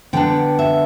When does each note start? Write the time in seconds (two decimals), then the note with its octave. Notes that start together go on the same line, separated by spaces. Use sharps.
0.13 D3 B3 D4 G5
0.59 E5